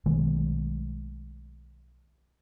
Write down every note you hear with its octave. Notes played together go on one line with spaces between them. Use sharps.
B1 D#3 G#3 A3